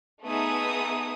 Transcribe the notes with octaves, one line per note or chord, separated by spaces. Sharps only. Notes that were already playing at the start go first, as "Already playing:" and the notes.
A3 B3 D#4 G#4 E5 D#6